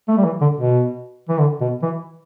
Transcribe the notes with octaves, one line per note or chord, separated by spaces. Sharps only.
A3
G3
E3
D3
B2
E3
D3
B2
E3